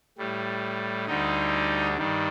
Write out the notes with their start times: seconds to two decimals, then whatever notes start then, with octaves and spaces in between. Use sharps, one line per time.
0.18 A2 G3
1.07 D2 D3 G3 D#4
1.97 G2 D#3 G3